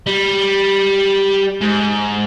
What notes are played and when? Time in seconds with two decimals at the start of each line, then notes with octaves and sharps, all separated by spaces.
0.06 G3
1.61 G#2